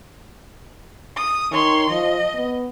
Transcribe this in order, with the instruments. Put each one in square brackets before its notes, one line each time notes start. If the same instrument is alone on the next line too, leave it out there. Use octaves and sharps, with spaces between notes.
[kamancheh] D#6
[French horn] D#3 [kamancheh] C#5 C6
[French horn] F3 [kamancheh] D#5
[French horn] B3